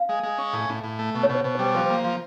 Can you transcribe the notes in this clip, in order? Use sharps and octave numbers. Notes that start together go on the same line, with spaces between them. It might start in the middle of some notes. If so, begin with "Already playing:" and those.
Already playing: F5
G#3
G#3
C#4
A2
A2
A2
A3
B2
C#5
B2
C5
B2
G3 C5
F3 C5
A#3
F3